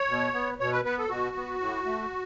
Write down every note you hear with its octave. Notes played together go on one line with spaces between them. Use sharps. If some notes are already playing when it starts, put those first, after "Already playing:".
Already playing: C#5
B2
B3
B2 C#5
B4
B3 B4
A4
B2 F#4
B3
A2
A3